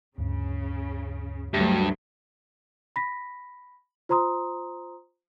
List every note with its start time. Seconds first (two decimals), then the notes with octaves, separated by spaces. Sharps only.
0.18 D2 G2 C#3
1.54 D2 G2 F#3 G4 E5
2.96 B5 A#6 B6
4.09 F4 C5 A#5 C6 D#6